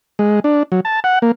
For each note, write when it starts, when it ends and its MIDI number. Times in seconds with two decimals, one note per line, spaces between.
0.19 0.40 56
0.44 0.63 62
0.72 0.80 54
0.85 1.00 81
1.04 1.19 78
1.22 1.32 58